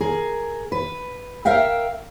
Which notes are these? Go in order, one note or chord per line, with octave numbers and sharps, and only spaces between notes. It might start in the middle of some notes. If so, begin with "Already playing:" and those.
G#4 A#4
B4
A#4 E5 F5 G5